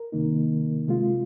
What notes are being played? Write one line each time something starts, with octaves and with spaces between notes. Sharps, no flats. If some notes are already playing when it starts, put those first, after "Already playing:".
Already playing: A#4
C2 C3 D#3 A#3 D#4
C3 G#3 F4